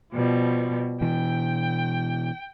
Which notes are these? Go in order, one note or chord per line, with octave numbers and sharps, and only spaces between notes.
B2 F3 G3
B2 E3 G5